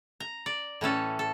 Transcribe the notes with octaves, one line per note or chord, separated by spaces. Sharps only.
A#5
D5
A2 E3 C#4 A4
A4